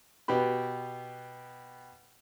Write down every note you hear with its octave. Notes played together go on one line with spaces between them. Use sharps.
B2 B3 G4 B5